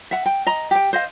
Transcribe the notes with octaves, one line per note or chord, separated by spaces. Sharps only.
E5 F#5
G5
D#5 A#5
G4 G5
C5 D#5 F5